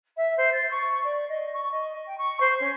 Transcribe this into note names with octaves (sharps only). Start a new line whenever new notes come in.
E5
C5
A6
C#6
D5
D#5
C#6
D#5
G5
C#6
C5
C#4